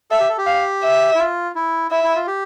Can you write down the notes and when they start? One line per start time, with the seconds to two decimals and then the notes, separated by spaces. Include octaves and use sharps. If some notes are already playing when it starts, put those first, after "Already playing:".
0.11 A4 E5
0.20 G4
0.29 A4
0.38 G4
0.47 F5
0.83 E5
1.15 E4
1.19 F4
1.55 E4
1.91 E4 E5
2.04 E4
2.16 F4
2.27 G4